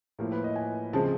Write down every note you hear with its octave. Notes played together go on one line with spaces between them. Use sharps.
A2 F3 A#3 A#4
B4
D#5
G#5
C#3 F3 G#3 C4 A5